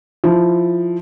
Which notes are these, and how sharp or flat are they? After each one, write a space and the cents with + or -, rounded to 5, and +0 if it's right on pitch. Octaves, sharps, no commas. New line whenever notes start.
F3 +0 E4 +0